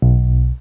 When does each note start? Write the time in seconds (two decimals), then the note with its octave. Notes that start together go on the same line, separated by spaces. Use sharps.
0.02 B1